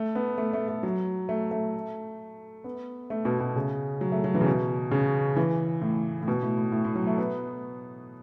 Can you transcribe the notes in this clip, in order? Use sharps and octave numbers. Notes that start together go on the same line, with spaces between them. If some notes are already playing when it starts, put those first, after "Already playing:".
Already playing: A3
B3
A3
A3
A3
F#3
A3
A3
B3
A3
B2
B2
C#3
F#3
A3
F#3
E3
C#3
B2
C#3
E3
A2
A2
B2
A2
A2
A2
A2
F#3
A3
B3